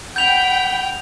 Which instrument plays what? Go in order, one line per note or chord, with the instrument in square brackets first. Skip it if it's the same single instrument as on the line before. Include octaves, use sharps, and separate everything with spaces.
[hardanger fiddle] F#5 B5 [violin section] G5 [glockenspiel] G6 F7